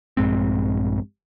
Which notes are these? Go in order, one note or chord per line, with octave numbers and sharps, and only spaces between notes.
A#1 G2 G#3 C4